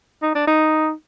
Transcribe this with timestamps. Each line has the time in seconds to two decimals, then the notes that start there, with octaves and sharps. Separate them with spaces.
0.22 D#4
0.35 D4
0.47 D#4